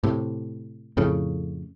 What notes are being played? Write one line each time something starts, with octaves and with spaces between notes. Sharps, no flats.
A2 C3
F2 A2 C#3